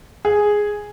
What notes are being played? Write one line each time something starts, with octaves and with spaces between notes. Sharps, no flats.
G#4